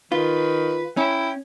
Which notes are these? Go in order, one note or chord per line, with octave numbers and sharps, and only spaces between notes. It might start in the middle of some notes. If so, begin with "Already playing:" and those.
D#3 F4 B4
C#4 E4 G5